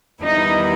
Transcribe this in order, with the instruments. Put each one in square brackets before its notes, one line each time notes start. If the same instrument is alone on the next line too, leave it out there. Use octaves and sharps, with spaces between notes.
[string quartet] E2 D#3 G3 B3 E4 [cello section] D#4